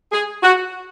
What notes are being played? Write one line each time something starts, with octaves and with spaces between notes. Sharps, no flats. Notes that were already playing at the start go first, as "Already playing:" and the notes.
G#4
F#4